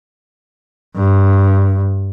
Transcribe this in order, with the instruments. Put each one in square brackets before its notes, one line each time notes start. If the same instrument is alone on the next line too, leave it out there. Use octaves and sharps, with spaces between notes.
[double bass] G2